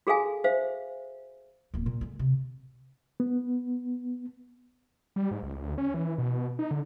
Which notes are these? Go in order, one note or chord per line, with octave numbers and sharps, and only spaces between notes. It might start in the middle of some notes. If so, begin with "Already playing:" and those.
F#4 G#4 A4 F5 G#5
C5 E5 F5
D1 A#3
A#2
D3 G#3
C3
B3
G3
G#2
C#2
D2
C#4
E3
B2
D#4
D3